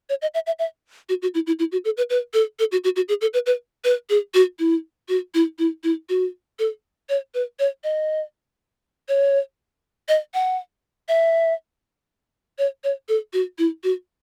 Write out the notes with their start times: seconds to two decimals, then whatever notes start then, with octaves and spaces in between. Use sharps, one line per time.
0.09 C#5
0.22 D#5
0.34 E5
0.46 E5
0.59 E5
1.09 F#4
1.22 F#4
1.34 E4
1.47 E4
1.59 E4
1.72 F#4
1.85 A4
1.97 B4
2.10 B4
2.34 A4
2.59 A4
2.72 F#4
2.84 F#4
2.96 F#4
3.09 G#4
3.21 A4
3.34 B4
3.46 B4
3.84 B4
4.10 G#4
4.34 F#4
4.59 E4
5.09 F#4
5.34 E4
5.59 E4
5.84 E4
6.09 F#4
6.59 A4
7.09 C#5
7.34 B4
7.59 C#5
7.84 D#5
9.08 C#5
10.09 D#5
10.34 F#5
11.08 E5
12.58 C#5
12.84 C#5
13.09 A4
13.33 F#4
13.58 E4
13.84 F#4